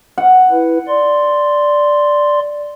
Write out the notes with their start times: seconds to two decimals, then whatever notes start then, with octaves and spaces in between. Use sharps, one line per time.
0.18 F#5
0.51 E4 B4
0.88 D5 C6